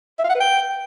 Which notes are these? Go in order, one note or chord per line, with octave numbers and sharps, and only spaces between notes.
E5
F5
F#5
B4
G5